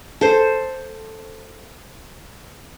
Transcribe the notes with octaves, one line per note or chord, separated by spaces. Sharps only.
A4 C5